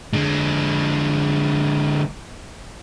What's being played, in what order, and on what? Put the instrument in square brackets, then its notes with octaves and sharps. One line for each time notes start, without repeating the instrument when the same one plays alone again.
[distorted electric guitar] D3 G#3